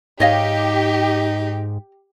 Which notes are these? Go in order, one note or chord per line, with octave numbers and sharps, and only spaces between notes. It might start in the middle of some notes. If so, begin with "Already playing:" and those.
G#2 D#4 G4 C#5 D#5 F5